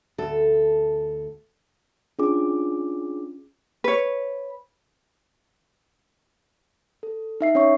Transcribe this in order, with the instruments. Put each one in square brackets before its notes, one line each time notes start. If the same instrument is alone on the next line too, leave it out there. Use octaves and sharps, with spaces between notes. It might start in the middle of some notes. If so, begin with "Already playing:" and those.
[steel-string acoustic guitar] D2 A4
[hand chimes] C#4 D4 F4 G#4 D6
[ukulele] B4 C#5
[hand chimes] A4
D#4 E5 C7
C#4 C#5 E5 C#6